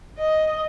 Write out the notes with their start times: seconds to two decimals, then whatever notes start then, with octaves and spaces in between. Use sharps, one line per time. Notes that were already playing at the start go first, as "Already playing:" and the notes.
0.18 D#5